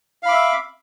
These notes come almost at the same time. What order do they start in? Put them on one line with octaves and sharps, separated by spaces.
F5 B5 D6 E5